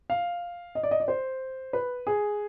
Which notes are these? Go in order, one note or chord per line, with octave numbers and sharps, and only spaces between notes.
F5
D#5
D5
D#5
D5
C5
B4
G#4